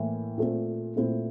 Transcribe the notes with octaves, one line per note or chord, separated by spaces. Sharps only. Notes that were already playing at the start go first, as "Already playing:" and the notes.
Already playing: A2 E3 A#3 E4
A#2 A3 C4
A#2 A3 C4 E4